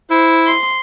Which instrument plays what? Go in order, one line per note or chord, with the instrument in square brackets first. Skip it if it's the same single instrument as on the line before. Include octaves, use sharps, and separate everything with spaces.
[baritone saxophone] E4 [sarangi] C5
[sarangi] C6